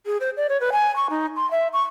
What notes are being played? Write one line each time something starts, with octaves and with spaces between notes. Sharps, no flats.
G#4
C5
D5
C#5
B4
G#5
C#6
D#4
C6
E5
C#6